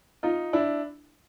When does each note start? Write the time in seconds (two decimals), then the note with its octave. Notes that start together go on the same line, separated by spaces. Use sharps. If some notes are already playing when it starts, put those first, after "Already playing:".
0.23 D#4 F4
0.53 D4 E4